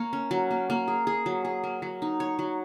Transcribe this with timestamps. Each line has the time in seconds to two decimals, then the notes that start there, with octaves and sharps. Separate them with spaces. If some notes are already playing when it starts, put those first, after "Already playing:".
Already playing: A#3 C#5
0.13 C#4
0.31 F#3
0.51 A#3
0.70 A#3
0.88 G#4
1.07 G#4
1.26 F#3
1.45 G#4
1.64 A#3
1.82 F#3
2.02 D#4
2.20 C#5
2.39 F#3